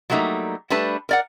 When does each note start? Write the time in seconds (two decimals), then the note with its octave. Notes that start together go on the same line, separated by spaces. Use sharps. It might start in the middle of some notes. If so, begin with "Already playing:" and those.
0.10 F#3 G3 A3 A#3 D#4
0.70 G3 A3 D4 B4 A5
1.09 A#4 D5 F#5